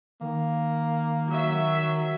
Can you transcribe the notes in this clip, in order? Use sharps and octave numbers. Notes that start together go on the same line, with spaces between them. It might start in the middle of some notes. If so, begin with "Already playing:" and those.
D#3 A#3
F#3 E5